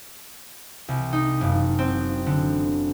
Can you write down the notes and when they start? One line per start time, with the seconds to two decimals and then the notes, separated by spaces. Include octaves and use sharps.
0.88 C2
1.13 D#4
1.41 F#1
1.79 C4
2.26 D3